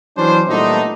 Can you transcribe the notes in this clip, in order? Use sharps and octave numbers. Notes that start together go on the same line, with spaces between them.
E3 F#3 B3 C#4 D4 C5
A#2 G3 A3 B3 D4 D#4